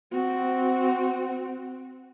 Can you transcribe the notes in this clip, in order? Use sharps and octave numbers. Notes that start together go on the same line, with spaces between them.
C4 F#4